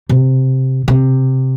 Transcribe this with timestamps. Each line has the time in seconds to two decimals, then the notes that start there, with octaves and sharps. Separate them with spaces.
0.09 C3
0.88 C3